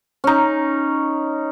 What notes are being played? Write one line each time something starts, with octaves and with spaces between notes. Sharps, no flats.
C#4 D#4